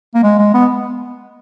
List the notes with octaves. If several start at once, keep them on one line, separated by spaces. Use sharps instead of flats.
A#3
G#3
G#3
B3